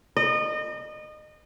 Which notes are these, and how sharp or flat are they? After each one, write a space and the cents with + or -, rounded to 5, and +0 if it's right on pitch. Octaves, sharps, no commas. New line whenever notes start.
D#5 -30